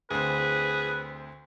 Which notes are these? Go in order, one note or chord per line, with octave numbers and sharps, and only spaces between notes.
D2 C4 G#4 B4